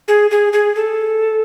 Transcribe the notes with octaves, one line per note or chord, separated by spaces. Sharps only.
G#4
G#4
G#4
A4